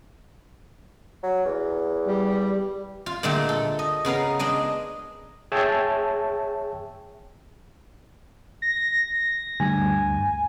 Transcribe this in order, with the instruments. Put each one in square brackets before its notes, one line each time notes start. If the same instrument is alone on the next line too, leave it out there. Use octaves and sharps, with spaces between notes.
[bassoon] F#3
E2
[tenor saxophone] G3
[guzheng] F4
A#2 D3 G#3 A3 G4
A4
D#5
C#3 B3 A#4 F5
G#3 D4 D#5
[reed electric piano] G#4 C#5 E5 G5 A5 E6
[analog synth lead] A#6
[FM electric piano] D2 G2 [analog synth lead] G#5